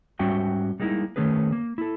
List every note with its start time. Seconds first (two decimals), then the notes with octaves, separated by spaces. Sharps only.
0.19 G#2 G3 C#4 F#4 E5 G5
0.80 G3 G#3 A#3 D#4 E4
1.16 D#3 E3 A3 C#4 G#4 B4
1.52 A#3
1.78 E4 A4